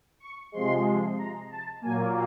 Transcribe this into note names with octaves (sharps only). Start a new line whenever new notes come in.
C#6
C3 F3 G#3 C6
A#5
A5
A#2 F#3 A#3 G#5